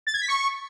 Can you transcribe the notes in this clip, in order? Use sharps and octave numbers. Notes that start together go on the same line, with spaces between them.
A6
G#6
B6
C#6